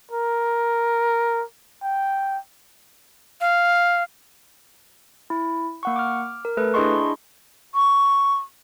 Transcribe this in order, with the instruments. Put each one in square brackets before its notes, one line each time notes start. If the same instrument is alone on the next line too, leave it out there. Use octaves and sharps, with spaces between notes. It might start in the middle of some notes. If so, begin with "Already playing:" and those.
[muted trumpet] A#4
G5
[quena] F5
[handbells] E4
A#3 F#5 C#6
D6 F6
A#4
A3 A4 B4
D4 E4 G#4 D#5 C6 C#6
[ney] C#6